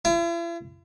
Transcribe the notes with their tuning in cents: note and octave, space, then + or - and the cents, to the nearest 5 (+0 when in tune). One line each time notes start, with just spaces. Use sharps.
E4 +45